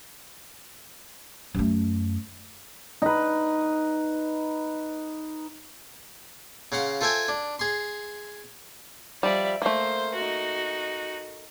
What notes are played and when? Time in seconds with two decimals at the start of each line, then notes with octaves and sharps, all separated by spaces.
1.55 F#2 A3
3.02 D#4 B4
6.72 C#3 F5 F#5 C6
7.01 F4 A4 C5 E5 G5 G#5
7.28 D4
7.59 G#4 C6
9.23 F3 G3 D5 E5
9.62 A3 A#3 C5
10.15 D#4 F#4